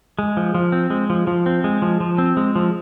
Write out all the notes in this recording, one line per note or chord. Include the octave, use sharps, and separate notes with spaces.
G#3
F3
F3
C4
G#3
F3
F3
C4
G#3
F3
F3
C4
G#3
F3